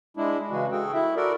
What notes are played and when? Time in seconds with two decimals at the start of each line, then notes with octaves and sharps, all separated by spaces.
0.17 G#3 D4 E4
0.51 C#3 E3 G#3 F#4
0.71 F#4 G#4 A4 G5
0.94 E4 E5
1.16 F#4 A4 A#4 D5